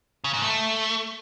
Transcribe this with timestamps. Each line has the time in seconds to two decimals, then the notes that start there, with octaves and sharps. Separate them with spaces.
0.24 C#3
0.33 G#2
0.42 A3